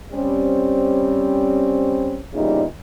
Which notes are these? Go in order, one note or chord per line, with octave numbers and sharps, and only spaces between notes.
G3 C4 C#4
E2 A#2 C#3 G3 D#4